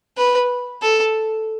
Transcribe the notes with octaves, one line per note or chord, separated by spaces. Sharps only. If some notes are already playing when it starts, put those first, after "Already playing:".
B4
A4